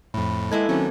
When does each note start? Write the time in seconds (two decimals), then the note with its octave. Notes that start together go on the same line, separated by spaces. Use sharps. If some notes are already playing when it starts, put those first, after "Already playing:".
0.14 F2 A2 B5
0.51 G#3 A#3 E4 A4 B4 A5 G#6
0.69 D#3 F#3 C4 C#4 C5